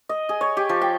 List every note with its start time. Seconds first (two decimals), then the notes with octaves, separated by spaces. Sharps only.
0.09 D#5
0.29 G#4
0.41 C#5
0.57 G4
0.69 F3
0.82 G5